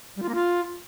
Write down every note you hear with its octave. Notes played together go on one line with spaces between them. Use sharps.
G3
F4
A#3
F4